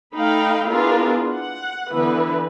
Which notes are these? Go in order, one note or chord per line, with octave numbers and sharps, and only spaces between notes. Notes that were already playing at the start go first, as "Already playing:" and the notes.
A3 D#4 F5 G5 B5
B3 D4 E4 F4 G#4 A#4
F#5
D3 E3 B3 E4 B4